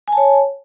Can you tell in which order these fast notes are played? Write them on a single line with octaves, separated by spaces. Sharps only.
G#5 A5 C#5